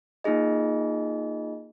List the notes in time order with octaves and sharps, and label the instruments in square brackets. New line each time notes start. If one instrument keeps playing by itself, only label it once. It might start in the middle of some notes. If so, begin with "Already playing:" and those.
[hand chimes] A#3 D#4 F4 G#4 D#5